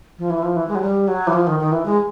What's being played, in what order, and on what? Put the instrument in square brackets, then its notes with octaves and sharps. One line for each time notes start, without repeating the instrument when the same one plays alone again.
[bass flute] F3
E3
F3
E3
G#3
F#3
G3
F#3
E3
F3
D#3
D#3
E3
G#3